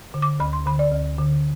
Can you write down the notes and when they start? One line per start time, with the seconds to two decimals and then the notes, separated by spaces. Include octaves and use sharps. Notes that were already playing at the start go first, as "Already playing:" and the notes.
0.14 D3
0.22 D6
0.40 D2 B5
0.53 C6
0.66 D3 B5
0.79 D5
0.92 D2
1.19 D3